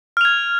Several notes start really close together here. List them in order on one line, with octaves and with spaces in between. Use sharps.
F6 F7 G#6